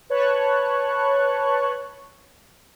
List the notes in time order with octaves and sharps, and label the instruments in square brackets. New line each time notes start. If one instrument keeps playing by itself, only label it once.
[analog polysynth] B4 C#5 A5 C#6 F#6